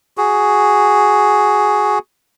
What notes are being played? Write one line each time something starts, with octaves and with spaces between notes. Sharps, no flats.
F#4 G#4